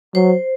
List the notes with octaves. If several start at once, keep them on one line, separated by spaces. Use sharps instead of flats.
F#3 C5